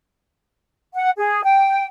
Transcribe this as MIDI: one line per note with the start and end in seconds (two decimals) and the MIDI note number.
0.94 1.10 78
1.17 1.41 68
1.44 1.85 79